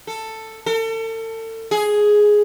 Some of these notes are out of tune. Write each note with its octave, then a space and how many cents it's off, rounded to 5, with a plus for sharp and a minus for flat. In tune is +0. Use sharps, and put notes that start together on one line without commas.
A4 +10
A4 +40
G#4 +5